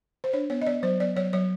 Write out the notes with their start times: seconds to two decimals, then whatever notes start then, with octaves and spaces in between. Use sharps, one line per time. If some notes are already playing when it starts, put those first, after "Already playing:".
0.24 C5
0.33 D4 C#5
0.50 B3 C#5
0.61 D#5
0.67 B3 D5
0.83 F#3 C5
1.00 B3 D5
1.16 F#3 C#5
1.33 F#3 C#5